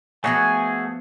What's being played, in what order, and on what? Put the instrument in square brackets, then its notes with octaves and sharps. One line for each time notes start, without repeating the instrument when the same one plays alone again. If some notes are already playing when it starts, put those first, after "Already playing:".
[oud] F3 B3 C#5 [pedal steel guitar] A3 F#4 G#4 [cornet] G#5